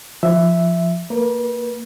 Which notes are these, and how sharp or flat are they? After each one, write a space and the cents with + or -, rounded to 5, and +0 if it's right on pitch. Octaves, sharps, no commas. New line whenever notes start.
F3 -10 E5 +0
A#3 -15 B4 -35